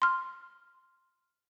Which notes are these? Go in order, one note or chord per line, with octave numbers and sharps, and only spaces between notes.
C6 F6